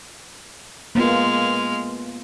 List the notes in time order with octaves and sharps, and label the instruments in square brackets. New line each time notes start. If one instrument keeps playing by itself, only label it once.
[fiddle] G#3 F6 [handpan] A#3 B3 F4